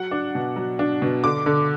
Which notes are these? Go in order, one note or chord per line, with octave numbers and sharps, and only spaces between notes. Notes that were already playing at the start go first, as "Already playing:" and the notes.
Already playing: F#3 F#5
D4
B2
F#3
D4
B2
D3 D6
D3